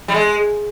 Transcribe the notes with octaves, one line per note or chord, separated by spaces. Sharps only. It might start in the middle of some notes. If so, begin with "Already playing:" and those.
G3
G#3